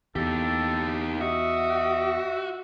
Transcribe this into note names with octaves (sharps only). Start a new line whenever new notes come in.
E2 D#4 G4 A4
F#4 D#5 E5